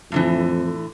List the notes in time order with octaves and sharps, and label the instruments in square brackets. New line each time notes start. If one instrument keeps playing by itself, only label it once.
[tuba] F2 [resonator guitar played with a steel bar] A2 D3 E3